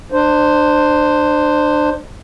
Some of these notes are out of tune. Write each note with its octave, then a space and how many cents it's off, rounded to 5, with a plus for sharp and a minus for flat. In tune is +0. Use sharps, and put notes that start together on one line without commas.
D4 +30 C5 +0